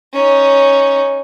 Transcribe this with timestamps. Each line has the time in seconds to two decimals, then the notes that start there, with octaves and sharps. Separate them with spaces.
0.13 C#4 D#4